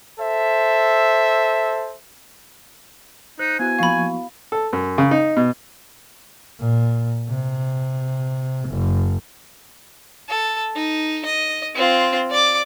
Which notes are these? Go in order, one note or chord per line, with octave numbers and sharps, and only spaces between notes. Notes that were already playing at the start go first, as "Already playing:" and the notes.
A4 C5 E5
D#4 C5 F#6
B3 E4 F#4 G#5
F3 A#3 F5 B5 C#6
A4
F#2
C#3
D#4
B2
A#2
C3
F#1
A4
D#4
D#5
C4 F4
D5 D6